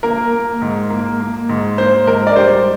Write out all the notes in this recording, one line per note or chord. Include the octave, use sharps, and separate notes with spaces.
A#3 A#4
A#3
G#2
A#3
A#3
G#2
A#3 C5
G#2 A#4
D5
G3 C5